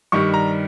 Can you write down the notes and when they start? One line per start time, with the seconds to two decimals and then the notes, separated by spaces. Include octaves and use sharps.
0.12 G2 D#3 G3 C#6
0.34 A#5